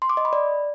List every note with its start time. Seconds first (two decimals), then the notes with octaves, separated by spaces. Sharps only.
0.02 C6
0.10 D6
0.17 D#5
0.25 B5
0.33 D5